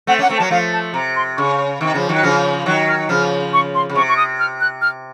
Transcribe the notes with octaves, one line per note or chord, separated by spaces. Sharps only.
A3 C4 F#5
A#3 C#4 F#5
A3 C4
A5
F#3 A#3
F3 A3 F5
A5
C3 A#5
C6
C#3 C#6
C3 D#3
C#3 F3
D#3 F#3
F#6
C#3 F3 F6
D#3 F#3 F#6
F6
C#3 F3 F6
C#6
C6
C#3
C3 C#6
C#6
D#6
F6
F#6
F6